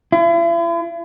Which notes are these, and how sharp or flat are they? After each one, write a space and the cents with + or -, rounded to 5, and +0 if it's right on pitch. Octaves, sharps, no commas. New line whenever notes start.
E4 +45